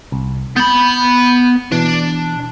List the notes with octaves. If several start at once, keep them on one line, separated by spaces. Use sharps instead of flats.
C2
B3 B5 G6
B2 E3 D4